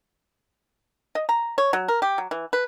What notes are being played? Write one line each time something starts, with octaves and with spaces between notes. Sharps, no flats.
D#5
A#5
C#5
F#3
A#4
G4
F#3
E3
B4